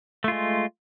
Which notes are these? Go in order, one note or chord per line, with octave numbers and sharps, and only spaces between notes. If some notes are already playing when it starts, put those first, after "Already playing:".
G#3 A3 F4